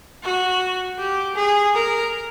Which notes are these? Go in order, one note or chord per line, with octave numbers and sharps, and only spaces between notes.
F#4
G4
G#4
A#4